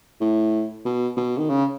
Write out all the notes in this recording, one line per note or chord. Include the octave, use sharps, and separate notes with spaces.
A2
B2
B2
D#3
C#3